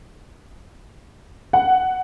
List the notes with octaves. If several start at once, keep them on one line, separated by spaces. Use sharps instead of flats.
F#5